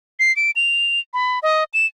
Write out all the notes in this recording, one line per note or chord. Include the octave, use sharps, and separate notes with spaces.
C7
D7
F7
B5
D#5
E7